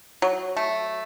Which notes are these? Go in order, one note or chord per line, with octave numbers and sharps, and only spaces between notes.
F#3
A3